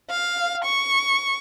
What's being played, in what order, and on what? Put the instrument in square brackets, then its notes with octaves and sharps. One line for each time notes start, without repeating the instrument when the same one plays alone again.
[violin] F5
C#6